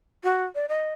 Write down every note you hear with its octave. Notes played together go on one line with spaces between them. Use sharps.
F#4
D5
D#5